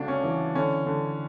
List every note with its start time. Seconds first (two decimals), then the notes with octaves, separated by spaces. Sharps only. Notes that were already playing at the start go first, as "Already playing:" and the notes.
Already playing: D2 C#3 D4
0.08 C#4
0.24 E3
0.55 D3 C#4
0.86 D3